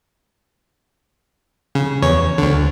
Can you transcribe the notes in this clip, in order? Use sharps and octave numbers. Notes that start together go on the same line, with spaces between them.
C#3
E2 C#5
D2 D3